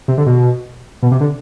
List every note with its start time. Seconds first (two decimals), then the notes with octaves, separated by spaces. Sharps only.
0.08 C3
0.18 D3
0.26 B2
1.03 B2
1.12 C3
1.20 D3